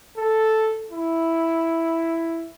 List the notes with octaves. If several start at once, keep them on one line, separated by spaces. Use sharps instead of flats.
A4
E4